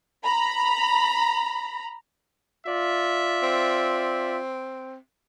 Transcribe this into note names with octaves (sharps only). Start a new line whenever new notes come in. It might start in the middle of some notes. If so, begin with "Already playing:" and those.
A#5 B5
F4 D5 E5
C4